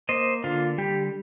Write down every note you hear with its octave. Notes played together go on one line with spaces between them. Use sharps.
A#3 C5 D#5
D3 F4
G3 G4